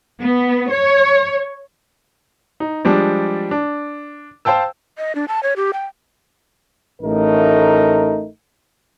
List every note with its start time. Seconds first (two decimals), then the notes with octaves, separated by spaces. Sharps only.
0.19 B3
0.69 C#5
2.60 D#4
2.85 F3 G3 G#3 D4
3.51 D4
4.45 C5 F5 G5 A5 E6
4.97 D#5
5.15 D4
5.28 A5
5.43 C#5
5.56 G4
5.73 G5
7.02 A1 A3 D#4 A#4